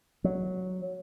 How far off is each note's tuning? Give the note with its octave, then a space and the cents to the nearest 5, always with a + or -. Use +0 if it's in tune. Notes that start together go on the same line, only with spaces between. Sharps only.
F#3 -5